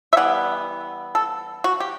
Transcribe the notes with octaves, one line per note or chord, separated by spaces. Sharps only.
E5
E3 G3 B3 F#5
A4
F#4
G4